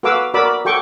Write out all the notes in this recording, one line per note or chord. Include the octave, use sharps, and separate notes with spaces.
F#4 A4 B4 F5 D6 E6
F#4 A#4 D5 B5 D6 E6
F#4 A4 G5 C#6 D6